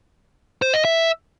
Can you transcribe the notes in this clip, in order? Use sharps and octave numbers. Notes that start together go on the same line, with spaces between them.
C5
D#5
E5